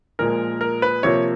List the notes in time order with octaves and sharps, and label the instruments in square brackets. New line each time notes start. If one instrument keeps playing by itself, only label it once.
[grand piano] A#2 F3 G#3 A#4
A#4
B4
C3 F3 A#3 C#5